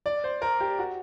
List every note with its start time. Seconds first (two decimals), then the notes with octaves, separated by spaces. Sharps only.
0.06 D5
0.24 C5
0.42 A#4
0.60 G4
0.79 F#4